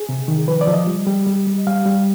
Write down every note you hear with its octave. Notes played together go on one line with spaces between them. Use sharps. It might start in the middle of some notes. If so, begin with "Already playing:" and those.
Already playing: G#4
C3
D#3
F3 B4
D5
F3
D#5
G3
G3
G3
G3
G3 F5
G3